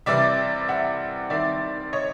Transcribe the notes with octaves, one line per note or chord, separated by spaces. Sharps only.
C3 E3 G3 D5 E5
E5 F#5
D#3 G3 C4 D5 E5
C#5 D#5